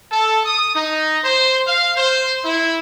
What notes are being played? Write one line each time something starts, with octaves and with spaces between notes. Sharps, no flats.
A4
D#6
D#4
C5
F5
C5
E4